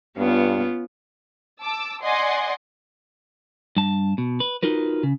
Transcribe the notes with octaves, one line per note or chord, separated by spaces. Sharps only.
G2 B3 C#4 F4
A5 D6 E6
D5 D#5 F#5 G#5 C6
G2 A5
B2
B4
D#4 F4 F#4 A#4 B4
C#3